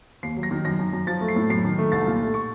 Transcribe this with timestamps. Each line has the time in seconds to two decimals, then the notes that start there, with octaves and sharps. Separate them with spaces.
0.23 D#2 C7
0.37 F#3
0.43 A#6
0.51 D#3
0.65 F#2 A#6
0.79 F#2
0.93 F#2
1.07 F3 A6
1.21 A3
1.28 C7
1.36 A2
1.50 F#2 C7
1.64 D#3
1.78 A3
1.92 C2 A6
2.07 A#2
2.20 A3
2.34 C#6